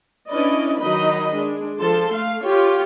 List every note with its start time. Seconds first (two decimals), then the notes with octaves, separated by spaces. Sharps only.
0.30 C#4 D4 E4 B4 D5 D#5
0.80 D#3 F#3 D#4 D#5 B5
1.35 G#3 D4
1.81 F3 A4 A5 C6
2.12 A3 F5
2.45 F4 G4 C#5